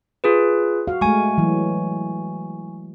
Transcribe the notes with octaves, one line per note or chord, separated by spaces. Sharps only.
F4 G#4 B4
F#4 F5
G#3 A3 G#5 C#6
E3 F#3